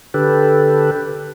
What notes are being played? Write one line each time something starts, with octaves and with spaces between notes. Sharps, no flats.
D3 G4 A4 B4